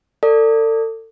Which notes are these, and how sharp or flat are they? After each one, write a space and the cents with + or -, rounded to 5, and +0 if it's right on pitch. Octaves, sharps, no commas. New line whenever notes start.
A4 +35 D5 +0